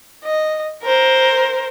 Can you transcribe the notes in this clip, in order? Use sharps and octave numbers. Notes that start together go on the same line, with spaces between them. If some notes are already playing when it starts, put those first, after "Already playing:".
D#5
A#4 C5